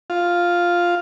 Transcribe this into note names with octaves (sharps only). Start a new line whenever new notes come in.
F4